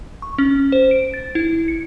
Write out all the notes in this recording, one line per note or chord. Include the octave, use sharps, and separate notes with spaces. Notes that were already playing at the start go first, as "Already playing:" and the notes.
C#6
C#4
C5
D7
A6
E4
C#7